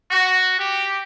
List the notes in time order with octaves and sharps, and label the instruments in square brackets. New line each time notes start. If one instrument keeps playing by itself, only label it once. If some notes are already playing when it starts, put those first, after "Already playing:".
[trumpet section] F#4
G4